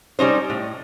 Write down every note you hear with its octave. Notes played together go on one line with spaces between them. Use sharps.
G3 C#4 D#4 C5
A2